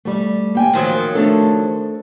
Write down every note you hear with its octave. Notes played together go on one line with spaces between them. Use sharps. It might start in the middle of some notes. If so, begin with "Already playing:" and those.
G3 A3
A#3 G5 G#5
D#3 F3 F#3
A3 D4 A4